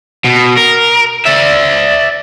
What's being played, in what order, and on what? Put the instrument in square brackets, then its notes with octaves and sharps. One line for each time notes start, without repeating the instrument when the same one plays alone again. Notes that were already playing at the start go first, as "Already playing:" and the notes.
[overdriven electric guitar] B2
A#4
D5 E5